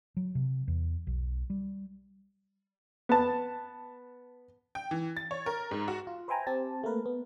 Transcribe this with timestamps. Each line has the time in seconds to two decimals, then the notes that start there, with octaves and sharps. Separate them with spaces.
0.17 F#3
0.35 C3
0.68 E2
1.07 B1
1.50 G3
3.09 B3 A5
4.75 G5
4.91 E3
5.17 A6
5.31 C#5
5.46 A#4
5.71 G#2
5.88 F#4
6.07 F4
6.28 B4 C5 E5 G5 G#5 A#5
6.47 C4 G4 A5
6.84 A3 A#3 A#4 B4
7.06 B3